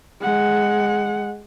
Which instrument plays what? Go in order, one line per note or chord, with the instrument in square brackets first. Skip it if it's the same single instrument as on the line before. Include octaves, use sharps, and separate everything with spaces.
[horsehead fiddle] G#3 F#5